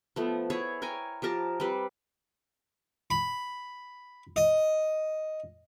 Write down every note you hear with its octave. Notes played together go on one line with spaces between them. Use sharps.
F3 A3 B3
E4 G#4 C#5
A#4 C#5 G5 G#5
F3 G4 A#4 A5
G3 C4 B4
B5
D#5